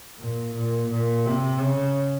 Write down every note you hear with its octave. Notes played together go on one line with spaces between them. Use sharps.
A#2
A#2
A#2
C3
C#3